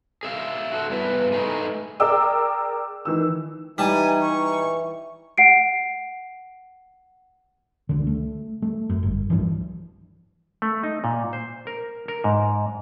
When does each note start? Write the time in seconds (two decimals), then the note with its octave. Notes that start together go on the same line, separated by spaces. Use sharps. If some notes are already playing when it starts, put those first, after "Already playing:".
0.23 G#4 E5 F5
0.72 F#4 A4
0.90 G2 B3 E4 B4
1.32 A3 D#4 G#4 B4
2.00 G#4 A#4 D5 G5 D6 E6
3.05 D#3 E3 E6
3.78 E3 G3 D#4 G#5 A5
4.21 E3 C#6
5.38 F#5 C7 D7
7.89 C#2 D3
8.07 A3
8.62 A3
8.89 F#2
9.03 G1
9.30 C2 G2 E3 F3
10.62 A3
10.83 D#4
11.04 A#2
11.33 C5
11.67 A#4
12.08 A#4
12.24 G#2